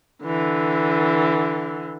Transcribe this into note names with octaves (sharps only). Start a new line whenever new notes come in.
D3 E3